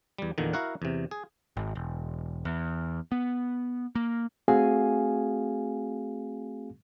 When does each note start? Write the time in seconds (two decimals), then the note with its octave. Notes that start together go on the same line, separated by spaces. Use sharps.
0.18 E2 G3
0.38 E2 A#2 D3 D#3
0.53 E4 F#4 A#4 F5 F#5
0.82 E2 C3
1.11 G#4
1.57 G#1
1.75 E1
2.45 E2
3.12 B3
3.95 A#3
4.48 A3 C4 F#4 G#4 F5 G#5